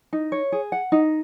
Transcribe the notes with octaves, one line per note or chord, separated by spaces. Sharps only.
D#4
C#5
G#4
F#5
D#4